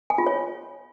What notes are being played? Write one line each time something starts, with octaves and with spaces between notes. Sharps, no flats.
G#5
F4
C#5